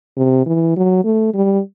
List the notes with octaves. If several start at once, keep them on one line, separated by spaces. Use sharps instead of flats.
C3
E3
F#3
A3
G3